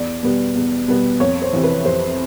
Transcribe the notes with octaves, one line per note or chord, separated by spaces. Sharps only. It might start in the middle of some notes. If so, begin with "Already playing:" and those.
Already playing: E2 D5
B2 G3 B3
E2
B2 G3 B3
F2 C#5
C5
C3 E3
B4
F2 C5